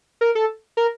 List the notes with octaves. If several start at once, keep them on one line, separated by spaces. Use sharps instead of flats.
A#4
A4
A#4